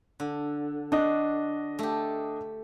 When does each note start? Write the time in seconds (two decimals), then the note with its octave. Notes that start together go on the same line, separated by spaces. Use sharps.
0.20 D3
0.92 D4 F#4 D#5
1.79 A3 G4